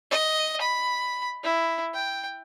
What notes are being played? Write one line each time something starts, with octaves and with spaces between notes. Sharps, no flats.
D#5
B5
E4
G5